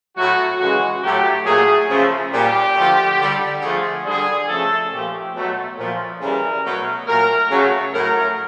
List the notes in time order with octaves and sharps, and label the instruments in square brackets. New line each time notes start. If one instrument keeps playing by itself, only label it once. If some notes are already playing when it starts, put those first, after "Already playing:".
[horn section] A2 F#3 A3 F#4
C#3 E3 G#3 F#4
A2 F#3 A3 G4
A#2 F#3 A3 G#4
C#3 F3 A3
A#2 G3 G4
D3 F3 A3
D3 G3
D3 F3 A3 G#4
D3 G3 G#4
C#3 F3 A3 A4
A#2 F3 A3 G4
B2 F#3 A3
A#2 F3 A3
C#3 E3 G3 A#4
B2 F#3 A3
A#2 F#3 A3 A#4
C#3 F#3 A3
A2 F#3 A3 A#4